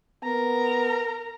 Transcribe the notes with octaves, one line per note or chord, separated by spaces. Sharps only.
B3 A#4 A#5